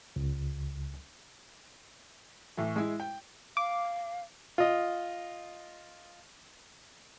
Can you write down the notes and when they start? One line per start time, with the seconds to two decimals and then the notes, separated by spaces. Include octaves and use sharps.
0.16 C#2
2.57 A2 E3
2.76 G#3 E4
3.00 G5
3.57 F5 D6
4.58 F4 D#5